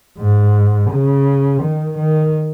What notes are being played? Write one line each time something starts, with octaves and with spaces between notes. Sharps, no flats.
G#2
C#3
D#3
D#3